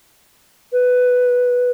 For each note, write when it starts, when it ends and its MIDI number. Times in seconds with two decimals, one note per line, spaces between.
0.73 1.71 71